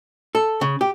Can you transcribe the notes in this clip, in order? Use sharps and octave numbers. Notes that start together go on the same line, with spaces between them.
A4
C#3
G4